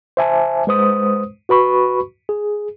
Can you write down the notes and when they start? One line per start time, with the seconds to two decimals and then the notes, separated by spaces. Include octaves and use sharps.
0.17 C5 E5 G#5 A5
0.67 G#3 B4 C5 D#6
1.49 F#4 B4 B5 C#6
2.29 G#4